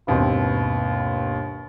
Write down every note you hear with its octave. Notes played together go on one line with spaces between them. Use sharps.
G1 D#2 B2 C4